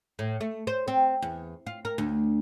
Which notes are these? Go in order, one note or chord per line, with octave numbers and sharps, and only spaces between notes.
A2
A3
C5
C4
E2
F4
A#4
D2